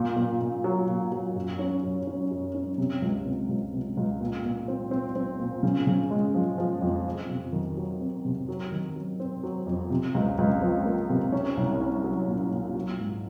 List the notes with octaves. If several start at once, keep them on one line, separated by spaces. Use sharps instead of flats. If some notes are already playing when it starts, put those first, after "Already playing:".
Already playing: A#2
A#2
A#2
F#3
A#2
F#3
F#2
C#4
F#2
C#4
F#2
C#4
C3
C#2
C3
C#2
C3
C#2
A#2
A#2
C4
C4
C4
A#2
C#3
C#3
G#3
F3
F3
F2
C4
C3
D#3
F#3
C4
C3
F#3
D#3
F#3
C4
F#3
F2
C3
C#2
C#2
F3
A#3
C3
C#4
C2
C#4
F#3
A#2
A#2
F#3
G#2